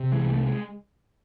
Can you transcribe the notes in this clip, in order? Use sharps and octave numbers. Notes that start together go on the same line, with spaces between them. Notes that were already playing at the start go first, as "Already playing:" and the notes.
Already playing: C3
E3 G#3
C2
A3
G#3